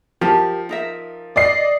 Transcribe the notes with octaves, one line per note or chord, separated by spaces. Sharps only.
F3 G4 A#4 A5
D#4 A#4 E5
D5 D#5 C7